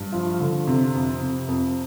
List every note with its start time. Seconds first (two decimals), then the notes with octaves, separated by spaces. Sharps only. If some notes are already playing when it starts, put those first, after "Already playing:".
Already playing: G2
0.12 F3
0.40 D3
0.67 C3
0.95 F2
1.21 C3
1.49 F2